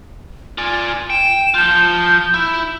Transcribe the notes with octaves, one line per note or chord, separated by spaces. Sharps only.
F4 D5 G#5
G5 E7
F3 F4 G6
E4